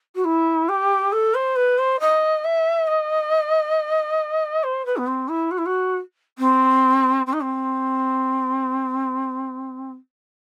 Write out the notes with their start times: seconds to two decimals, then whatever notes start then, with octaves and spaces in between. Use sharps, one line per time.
0.15 F#4
0.24 E4
0.69 G4
1.12 A4
1.34 C5
1.56 B4
1.78 C5
2.00 D#5
2.44 E5
2.87 D#5
4.63 C5
4.85 B4
4.97 B3
5.07 C4
5.28 E4
5.51 F#4
5.58 E4
5.66 F#4
6.38 C4
7.26 C4
7.33 D#4
7.41 C4